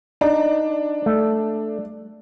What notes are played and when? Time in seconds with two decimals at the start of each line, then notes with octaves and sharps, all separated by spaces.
0.21 D4 D#4
1.06 A3